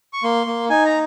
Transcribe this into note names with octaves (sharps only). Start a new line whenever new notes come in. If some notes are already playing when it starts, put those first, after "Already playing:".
C#6
A#3 C6
A#3
D#4 G#5
A#5